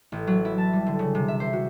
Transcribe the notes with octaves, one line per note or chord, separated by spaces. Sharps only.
A1
F#3
E4
A5
G3
D3
C#3
C3
E5
C5
F#4